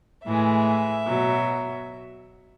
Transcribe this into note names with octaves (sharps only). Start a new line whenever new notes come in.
A2 E3 G#3 E5
B2 F#3